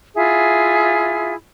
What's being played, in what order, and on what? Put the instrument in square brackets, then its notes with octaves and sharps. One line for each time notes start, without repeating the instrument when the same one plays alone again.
[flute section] E4 F4 G#4 E5